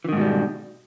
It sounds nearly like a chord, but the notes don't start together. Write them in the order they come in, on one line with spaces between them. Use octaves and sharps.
E3 D#3 G#2 B2 G3